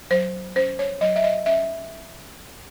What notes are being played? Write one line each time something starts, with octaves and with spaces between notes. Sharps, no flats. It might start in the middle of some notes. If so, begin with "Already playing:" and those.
F#3 C5
C#4 C5
C#5
F#3 D#5
E5
D#5
C#4 E5